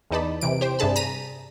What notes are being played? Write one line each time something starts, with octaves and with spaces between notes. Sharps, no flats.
E2 E3 D#4 D5 A5 B5
C3 E3 D7
G4 C5 G5
G2 C3 D4 G#4 A5 B5
A#5 B6 D#7